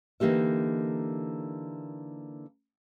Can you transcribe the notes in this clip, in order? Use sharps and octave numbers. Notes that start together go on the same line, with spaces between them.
D3 E3 A#3 D#4 G4 E5